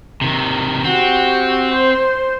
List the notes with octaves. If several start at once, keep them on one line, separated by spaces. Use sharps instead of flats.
C3 D#3
C4 F#4 G4
C5